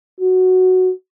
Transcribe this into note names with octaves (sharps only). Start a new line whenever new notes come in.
F#4